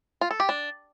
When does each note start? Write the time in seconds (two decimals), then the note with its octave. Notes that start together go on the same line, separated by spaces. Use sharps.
0.21 F4
0.31 A4
0.40 G4
0.49 D4